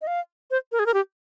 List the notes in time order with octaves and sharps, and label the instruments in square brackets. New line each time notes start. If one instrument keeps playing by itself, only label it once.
[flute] D#5
F5
C5
A#4
G#4
A#4
G4